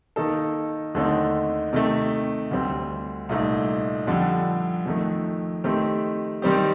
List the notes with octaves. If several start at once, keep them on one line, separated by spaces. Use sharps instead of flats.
D#3 A#3 D#4 A4
D#2 D3 A3 C4 D#4
C3 D#3 A3
D2 D3 G3 C4
C2 A#2 A3 D#4
F2 D3 G3
F2 D#3 A3
D#3 A3 C4 G4
D#3 G3 C4 G4